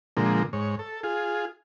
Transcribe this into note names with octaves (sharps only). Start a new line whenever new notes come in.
A#2 D3 F3 G#3 A#3
G#2 C#5
A4
F4 G#4